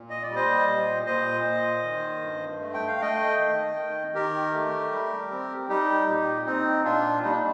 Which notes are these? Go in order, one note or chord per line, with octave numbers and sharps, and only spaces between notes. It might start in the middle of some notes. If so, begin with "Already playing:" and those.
Already playing: A#2
D#5
D5
G3
C5 D#5
A#2
A#2 C5 D#5
A#2
D#3
G2
A3
G5
F5
A3 D#5 G5
D#3
D#3
D#3 G4 A#4
A3
G3
C4
G3 D#4 G4
A#2
C4 D#4
A#2 D4 F4
G3 D#4
D4